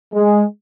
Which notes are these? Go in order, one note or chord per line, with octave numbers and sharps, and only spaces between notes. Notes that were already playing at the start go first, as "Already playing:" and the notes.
G#3